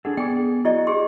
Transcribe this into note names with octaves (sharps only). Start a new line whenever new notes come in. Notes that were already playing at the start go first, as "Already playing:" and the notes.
D4 G#4 A4 F#5
B3 G#4 D5 G5 G#5
E4 F#4 D5 D#5
G4 G#4 C6